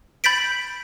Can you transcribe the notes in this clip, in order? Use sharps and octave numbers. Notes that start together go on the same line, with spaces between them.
B5 G6 A6 B6 D7